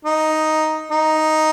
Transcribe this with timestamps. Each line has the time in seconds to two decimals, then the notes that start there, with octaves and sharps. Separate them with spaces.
0.05 D#4
0.91 D#4